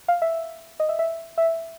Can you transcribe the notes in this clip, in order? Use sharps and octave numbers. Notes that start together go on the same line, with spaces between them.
F5
E5
D#5
E5
E5
E5